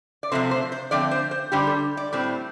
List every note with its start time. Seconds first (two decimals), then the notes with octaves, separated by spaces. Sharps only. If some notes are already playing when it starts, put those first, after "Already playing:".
0.23 D5
0.32 C3 F3 A3 C4 C5
0.51 C5
0.72 C5
0.91 D3 F3 A3 C4 D5
1.11 C5
1.31 C5
1.52 D3 G3 D4 G4
1.67 A4
1.97 D5
2.13 A2 G3 C4